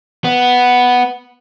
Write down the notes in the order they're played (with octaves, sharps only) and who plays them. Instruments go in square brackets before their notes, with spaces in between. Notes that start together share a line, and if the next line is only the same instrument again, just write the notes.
[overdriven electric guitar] B3